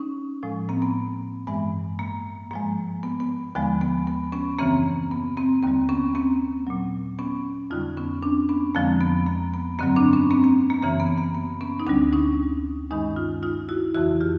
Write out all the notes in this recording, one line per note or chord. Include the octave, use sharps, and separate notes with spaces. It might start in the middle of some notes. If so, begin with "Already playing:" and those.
Already playing: C#4 D#4
A2 F3 G#3
A#3 C4
B3
G2 E3 G#3 B3
A#3
G#2 F3 G#3 A#3
B3
B3
D#2 D3 F3 G#3 B3
B3
B3
B3 C#4
F#2 C#3 E3 A#3 C4
B3
A#3 C4
D#2 D3 G3 A#3 C4
B3 C#4
A#3 C4
A#2 F#3
B3 C#4
F2 D3 G3 D#4 F4
B3 C#4
C4 D4
B3 C#4
F2 D3 F3 G#3 A#3 C4
B3
A#3
B3
G2 D3 F#3 A#3 C4
C4 D4
B3 C#4
A#3 C4
A#3 C4
A#3
F#2 C#3 E3 A#3
B3
A#3
B3
B3 C#4
D#4
D2 D3 G3 C4 D4
C#4 D#4
G2 D#3 G#3 C#4 D#4
D#4 F4
D#4 F4
E4 F#4
F2 C#3 E3 E4 F#4
F4 G4